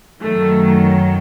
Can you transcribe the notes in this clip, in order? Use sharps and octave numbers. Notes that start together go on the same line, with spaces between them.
F#2 D#3 F#3 A3